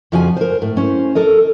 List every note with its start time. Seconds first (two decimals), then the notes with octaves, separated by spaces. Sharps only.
0.12 F2 C#3 F3 F#4 C5 G#5
0.37 A#4 C5
0.62 A2
0.77 C#4 C5
1.15 A4 A#4 D#5